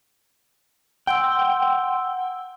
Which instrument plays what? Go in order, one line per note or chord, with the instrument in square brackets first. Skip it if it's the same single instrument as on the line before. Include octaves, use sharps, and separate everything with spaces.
[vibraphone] F#5 C6 E6 [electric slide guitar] G5